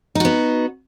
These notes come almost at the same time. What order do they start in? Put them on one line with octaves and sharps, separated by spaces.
D#4 F#4 B3